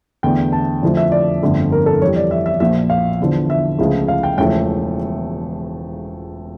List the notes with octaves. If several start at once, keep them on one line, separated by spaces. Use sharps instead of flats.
E2 D3 A3 G5
A5
F2 D3 F3 A3
E5
D5
G1 F2 D3 A3
A#4
A4
F2 E3 G3 C#5
D5
E5
E5
A#1 A#2 F3 E5
F5
E2 D3 F3
E5
C#2 C#3 F3 A3
F5
G5
E1 E2 C#3 F3 A3 G5